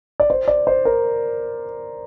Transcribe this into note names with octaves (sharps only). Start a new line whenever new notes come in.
D5
C5
D5
C5
A#4